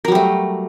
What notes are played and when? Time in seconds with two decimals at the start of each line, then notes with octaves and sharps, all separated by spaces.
0.05 A#4
0.08 F#3
0.12 G3
0.15 A3